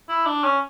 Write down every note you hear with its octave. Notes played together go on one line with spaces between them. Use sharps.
E4
D4
C#4